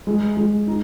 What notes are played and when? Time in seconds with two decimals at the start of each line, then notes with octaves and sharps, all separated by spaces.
0.07 G#3
0.37 G#3
0.67 D#4